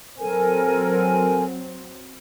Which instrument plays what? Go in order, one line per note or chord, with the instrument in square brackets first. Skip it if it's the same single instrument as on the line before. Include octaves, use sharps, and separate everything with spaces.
[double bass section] F#3 C4 [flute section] A4 A#4 G#5